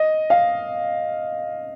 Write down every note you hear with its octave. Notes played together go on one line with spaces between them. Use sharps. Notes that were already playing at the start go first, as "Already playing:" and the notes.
Already playing: D#5
F5